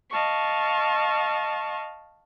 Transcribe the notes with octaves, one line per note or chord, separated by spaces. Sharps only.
D#5 F5 A5 C#6